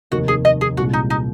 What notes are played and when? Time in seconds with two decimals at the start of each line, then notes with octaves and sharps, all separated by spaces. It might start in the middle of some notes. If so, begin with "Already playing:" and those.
0.11 F1 D#2 D#3 A#3 F#4
0.28 G#4
0.45 D#5
0.61 G#4
0.77 C2 A#2 G#3 F#4
0.93 D#4
1.10 D#4